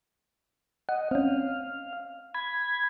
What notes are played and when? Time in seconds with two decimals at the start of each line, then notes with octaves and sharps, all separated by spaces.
0.89 D#5 F#5
1.11 C4 C#4 F5
2.34 B5 G#6